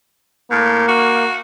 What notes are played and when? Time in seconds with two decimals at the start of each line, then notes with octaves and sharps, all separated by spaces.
0.51 A2 A#3
0.88 F#4